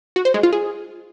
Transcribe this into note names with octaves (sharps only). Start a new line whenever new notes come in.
F#4
C5
G#3
F4
G#4